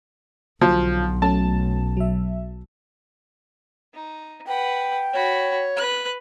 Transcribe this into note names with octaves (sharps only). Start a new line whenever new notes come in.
B1 D3 F3 F#3
F#3 A3 C#4 A5
F#3 E5
D#4
B4 F#5 G5
F#4 C#5 B5
B4 F#6